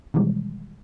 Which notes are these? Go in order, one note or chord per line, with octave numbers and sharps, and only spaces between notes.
B2 D#3 E3 G3 G#3